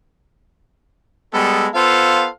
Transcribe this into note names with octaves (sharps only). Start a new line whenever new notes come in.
G3 G#3 B3 A4
B3 F4 A4 C5 F5